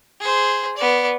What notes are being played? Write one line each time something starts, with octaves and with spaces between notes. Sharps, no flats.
G#4 C5
B3 D5